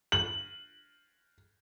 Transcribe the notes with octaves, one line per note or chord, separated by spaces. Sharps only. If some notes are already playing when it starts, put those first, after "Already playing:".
F#7